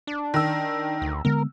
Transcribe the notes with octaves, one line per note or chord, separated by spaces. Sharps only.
D4
D#3 E6
D2
D3 G#3 B3 A#4